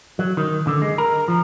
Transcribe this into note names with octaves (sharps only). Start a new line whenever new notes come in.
F#3
D#3
D3
G#3
A#4
F3